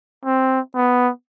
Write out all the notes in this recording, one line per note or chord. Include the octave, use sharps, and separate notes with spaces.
C4
B3